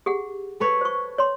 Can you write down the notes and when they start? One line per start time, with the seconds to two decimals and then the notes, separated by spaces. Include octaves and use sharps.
0.06 G4 G#4 F#5
0.60 A4 B4 C#5
0.81 C5 C#6
1.18 C#5 C6